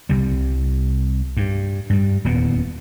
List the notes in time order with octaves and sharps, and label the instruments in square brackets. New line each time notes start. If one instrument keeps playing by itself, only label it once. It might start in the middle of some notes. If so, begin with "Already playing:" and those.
[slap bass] C2 C3 G3
G2
G2 G3
D#1 E2 A#2 B3